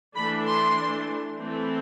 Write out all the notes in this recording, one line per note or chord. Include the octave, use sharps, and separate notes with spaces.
E3 A3 D4 B5
C6
E3 A3 C4